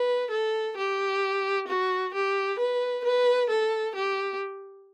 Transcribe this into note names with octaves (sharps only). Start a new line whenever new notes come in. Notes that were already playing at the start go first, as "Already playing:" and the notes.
Already playing: B4
A4
G4
F#4
G4
B4
B4
A4
G4